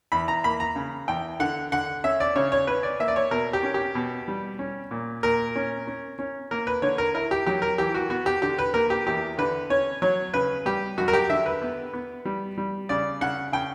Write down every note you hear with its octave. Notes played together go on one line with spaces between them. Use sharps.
E2 B5
A#5
A#3 B5
A#5
C#3
E2 G5
D3 F#5
D3 F#5
C#4 E5
D5
C#3 C#5
C#5
C#4 B4
D5
A#3 E5
D5
C#5
B2 A#4
G4
C#4
G4
B2
G3
C#4
A#2
A#2 A#4
C#4
C#4
C#4
A#3 A#4
B4
D3 C#5
A#4
E4 A#4
G4
F#3 G4
A#4
E3 G4
F#4
B3 F#4
G4
D3 G4
B4
A#3 A#4
G4
E2 G4
D3 B4
C#4 C#5
F#3 C#5
C#3 B4
G3 G4
F#2 F#4
A#4
G4
D3 E5
B4
B3
B3
G3
G3
C#3 D5
C#3 F#5
C#3 G5